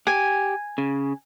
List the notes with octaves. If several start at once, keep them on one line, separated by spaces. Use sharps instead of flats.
G4 G#5
C#3